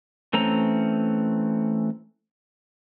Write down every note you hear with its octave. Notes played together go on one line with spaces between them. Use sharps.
E3 A3 C4 C#4 A#5